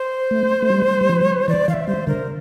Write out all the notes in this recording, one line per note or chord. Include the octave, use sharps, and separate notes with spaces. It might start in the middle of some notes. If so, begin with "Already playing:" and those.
Already playing: C5
A3
A3
G3
G3
F3
E3 D5
E3 F5
E5
G3 C5
D3 A#4